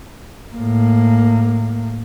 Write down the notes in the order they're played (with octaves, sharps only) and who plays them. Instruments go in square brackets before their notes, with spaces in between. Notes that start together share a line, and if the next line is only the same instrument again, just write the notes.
[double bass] A2 A#3